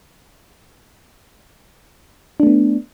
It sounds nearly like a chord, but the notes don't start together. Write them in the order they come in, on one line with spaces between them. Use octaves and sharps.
D4 A3 B3